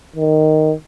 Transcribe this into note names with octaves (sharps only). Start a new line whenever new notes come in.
D#3